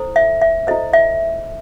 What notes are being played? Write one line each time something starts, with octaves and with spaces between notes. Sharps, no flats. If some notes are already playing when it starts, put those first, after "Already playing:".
Already playing: E4 A4 C5
E5
E5
E4 A4 C5 D#5
E5